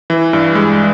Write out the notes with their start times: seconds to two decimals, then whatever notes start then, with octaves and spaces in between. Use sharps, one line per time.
0.10 E3
0.33 G2
0.55 G#3